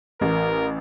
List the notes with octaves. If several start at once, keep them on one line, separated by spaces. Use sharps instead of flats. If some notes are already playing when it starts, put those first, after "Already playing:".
A1 A#4